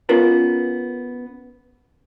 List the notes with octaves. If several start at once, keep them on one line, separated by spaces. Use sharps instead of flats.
B3 C#4 F4 A#4 B4